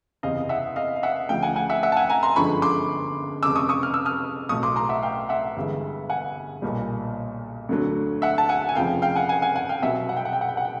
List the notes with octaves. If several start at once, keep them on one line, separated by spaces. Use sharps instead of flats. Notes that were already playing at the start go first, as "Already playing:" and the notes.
F#1 E2 C3 D#5 F5
E5 F#5
D#5 F5
F5
E5 F#5
D2 C#3 F3 F5 G5
F#5 G#5
F#5 G#5
E5 F#5
E5 F#5
A5
F#5 G#5
G#5 A#5
A#5 C6
G1 F#2 D3 F3 G#3 B5 C#6
C6 D6
F1 F2 C#3 D6 E6
C#6 D#6
C#6 D#6
F6
E6
D#6 F6
B1 A2 F#3 C#6 D#6
C6 D6
A#5 C6
E5 F#5
F5 G5
E5 F#5
G1 G2 E3 G#3
F#5 G#5
B1 A#2 G3
D2 D3 F#3
E5 F#5
A5
F#5 G#5
G#5
F1 F2 C#3 F3 F5 G5
F5 G5
F#5 G#5
F#5 G#5
F#5 G#5
F#5 G#5
F5 G5
C2 B2 F#3 E5 F#5
F#5
G5
F#5
G5
F#5
G5
F#5
G5